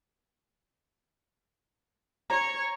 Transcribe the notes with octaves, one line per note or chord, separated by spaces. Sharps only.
C#5 A#5